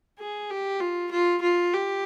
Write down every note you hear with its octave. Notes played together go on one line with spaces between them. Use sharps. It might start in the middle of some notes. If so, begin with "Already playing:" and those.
G#4
G4
F4
F4
F4
G4